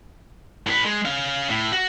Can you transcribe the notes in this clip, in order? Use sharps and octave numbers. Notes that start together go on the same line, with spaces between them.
A2 B4
G#3
C#4 F5
A2
F#4